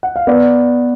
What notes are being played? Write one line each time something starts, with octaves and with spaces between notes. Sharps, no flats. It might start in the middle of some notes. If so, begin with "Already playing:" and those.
F#5
F5
B3 D5